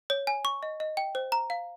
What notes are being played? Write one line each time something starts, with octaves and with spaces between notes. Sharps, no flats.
C#5
G#5
C#6
D#5
D#5
G5
C5
A#5
F5